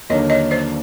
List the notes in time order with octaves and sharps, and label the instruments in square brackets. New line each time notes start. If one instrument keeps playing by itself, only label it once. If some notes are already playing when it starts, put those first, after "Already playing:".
[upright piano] D#2 D3 F#3 A#3 [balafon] C#5 D#5
[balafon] C#5 D#5
C5 D5